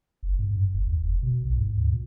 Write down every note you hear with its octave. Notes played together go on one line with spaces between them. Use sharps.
F#1
G#2
F#2
F#1
E2
F1
B2
B1
G#2
D2
A#2